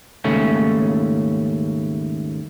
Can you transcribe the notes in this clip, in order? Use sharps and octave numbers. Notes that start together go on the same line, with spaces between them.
D#2 G#2 C#3 A3 C#4